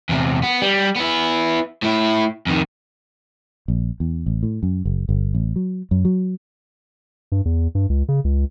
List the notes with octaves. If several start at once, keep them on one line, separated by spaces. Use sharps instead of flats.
E2 C3
B3
G3
B3 E4
A2 E4
F2 D#3
A#1
E2
A1
A2
F#2
F#1
G1
A1
F#3
F#2
F#3
G2
E2
G2
C#2
C#3
C#2